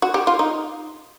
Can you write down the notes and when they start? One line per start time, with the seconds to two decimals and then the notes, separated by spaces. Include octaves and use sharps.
0.02 F#4
0.14 G4
0.27 F4
0.39 D#4